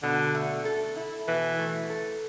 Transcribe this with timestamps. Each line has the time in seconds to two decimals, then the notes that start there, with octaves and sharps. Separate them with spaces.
0.03 B2 D3
0.35 A3
0.65 A4
0.96 E4
1.28 B2 E3
1.59 A3
1.90 A4